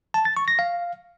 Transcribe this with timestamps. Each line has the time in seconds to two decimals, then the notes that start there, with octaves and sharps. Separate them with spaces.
0.14 A5
0.25 A6
0.37 C#6
0.48 A#6
0.59 F5